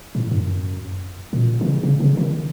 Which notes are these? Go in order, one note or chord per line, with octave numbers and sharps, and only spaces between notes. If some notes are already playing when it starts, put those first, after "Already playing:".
A2
F#2
A#2
D#3
C#3
C#3
C#3
D#3